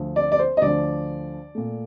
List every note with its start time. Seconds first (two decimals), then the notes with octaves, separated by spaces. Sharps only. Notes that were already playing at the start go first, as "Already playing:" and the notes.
Already playing: D2 D3 F3
0.16 D5
0.32 D5
0.39 C5
0.57 D#5
0.62 D2 D3 F3 D5
1.55 A#2 A3